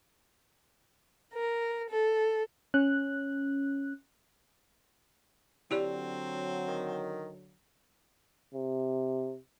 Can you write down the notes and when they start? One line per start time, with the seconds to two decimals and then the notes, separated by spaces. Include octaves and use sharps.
1.33 A#4
1.89 A4
2.74 C#4 F#6
5.71 D3 F#3 C4 E4 G4 D5
6.68 D#3
8.54 C3